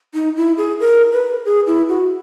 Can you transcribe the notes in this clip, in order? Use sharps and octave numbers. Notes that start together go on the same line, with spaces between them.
D#4
E4
G#4
A#4
B4
G#4
E4
F#4